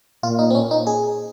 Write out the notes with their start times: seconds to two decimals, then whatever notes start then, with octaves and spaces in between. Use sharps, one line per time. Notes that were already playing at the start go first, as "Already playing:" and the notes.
0.23 A#2 F4
0.39 D#4
0.50 C4
0.55 C#4
0.71 D#4
0.87 G#4